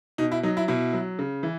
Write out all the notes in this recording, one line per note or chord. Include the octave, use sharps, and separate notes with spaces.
B2 D#4
E4
F#3 D#4
E4
B2 E4
F#3
C#3
E3